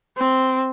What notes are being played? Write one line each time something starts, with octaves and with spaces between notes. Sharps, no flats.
C4